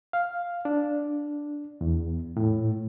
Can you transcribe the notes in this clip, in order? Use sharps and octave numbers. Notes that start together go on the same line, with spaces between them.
F5
D4
E2
A2